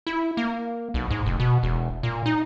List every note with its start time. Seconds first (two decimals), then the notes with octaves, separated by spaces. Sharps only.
0.07 E4
0.37 A#3
0.94 B1
1.10 G#2
1.26 F1
1.40 B2
1.63 E1
2.03 A#2
2.26 D#4